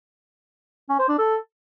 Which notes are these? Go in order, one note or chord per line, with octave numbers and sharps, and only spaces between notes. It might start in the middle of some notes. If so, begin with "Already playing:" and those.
C#4
C5
D4
A4